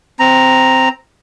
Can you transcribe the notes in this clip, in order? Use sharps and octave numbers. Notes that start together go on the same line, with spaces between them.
C4 A#5